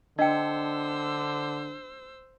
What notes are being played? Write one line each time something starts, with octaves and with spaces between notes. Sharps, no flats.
D3 D4 C5 D#5 G5 E6 C#7